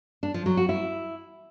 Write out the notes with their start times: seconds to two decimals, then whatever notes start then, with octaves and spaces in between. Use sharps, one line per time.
0.23 D4
0.34 F3
0.46 F#3
0.57 F#4
0.69 E4